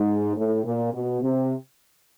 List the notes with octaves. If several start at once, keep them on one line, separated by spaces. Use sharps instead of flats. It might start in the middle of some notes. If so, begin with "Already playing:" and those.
Already playing: G#2
A2
A#2
B2
C3